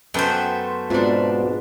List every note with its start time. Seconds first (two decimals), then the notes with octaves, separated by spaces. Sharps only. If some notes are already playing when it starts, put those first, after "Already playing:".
0.14 F#2 A3 B3 C5 G5
0.90 G#2 B2 G#3 C4 D4 F4